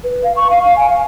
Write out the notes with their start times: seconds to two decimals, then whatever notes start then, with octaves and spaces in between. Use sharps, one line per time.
0.03 B4
0.23 F5
0.36 C#6
0.50 F5
0.62 F5
0.76 G#5
0.89 F5